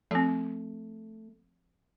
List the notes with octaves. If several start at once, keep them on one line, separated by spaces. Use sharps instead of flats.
F3 A3 C4